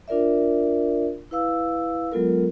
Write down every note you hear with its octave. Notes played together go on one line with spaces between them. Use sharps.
D4 F4 A#4 D5 E5
E4 B4 F5 E6
F#3 G#3 B3 F4 A4 A#4